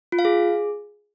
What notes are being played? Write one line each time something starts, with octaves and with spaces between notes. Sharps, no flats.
F4
F5
G#4